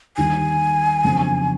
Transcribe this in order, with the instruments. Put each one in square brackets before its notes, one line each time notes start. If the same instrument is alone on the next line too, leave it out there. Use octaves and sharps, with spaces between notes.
[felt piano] D#2 D#3 G3 [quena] G#5
[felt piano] F2 C#3 F#3 B3 D4